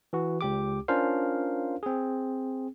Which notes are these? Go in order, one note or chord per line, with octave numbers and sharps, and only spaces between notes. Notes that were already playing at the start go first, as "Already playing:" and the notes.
E3 F#4
C#2 G4 D6
C#4 D4 F4 A#4 C5 F5
C4 G#4